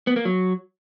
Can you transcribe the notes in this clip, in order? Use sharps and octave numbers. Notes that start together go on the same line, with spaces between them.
B3
A#3
F#3